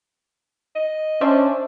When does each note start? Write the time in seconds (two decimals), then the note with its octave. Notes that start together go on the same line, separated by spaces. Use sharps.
0.76 D#5
1.21 C#4 D4 C5 D5 E5